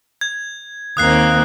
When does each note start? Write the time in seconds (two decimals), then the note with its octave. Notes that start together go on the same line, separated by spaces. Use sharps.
0.21 G#6
0.97 D#2 A#3 C4 D#6 F#6 C7